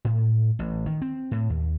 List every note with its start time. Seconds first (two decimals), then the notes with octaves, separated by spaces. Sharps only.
0.05 A2
0.59 A1
0.86 D#3
1.02 C4
1.31 A2
1.50 D#2